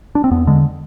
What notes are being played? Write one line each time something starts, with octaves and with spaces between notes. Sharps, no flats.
D4
C4
E2 B3
D3 G#3